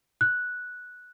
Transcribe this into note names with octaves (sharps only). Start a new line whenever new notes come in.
F#6